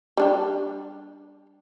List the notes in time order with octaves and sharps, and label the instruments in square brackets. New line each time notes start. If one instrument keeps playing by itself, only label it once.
[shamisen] G3 D4 G4